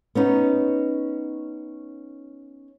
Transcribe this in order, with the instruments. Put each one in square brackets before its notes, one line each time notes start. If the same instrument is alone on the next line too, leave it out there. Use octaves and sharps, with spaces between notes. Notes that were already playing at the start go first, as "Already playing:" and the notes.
[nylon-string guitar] B3 C#4 D#4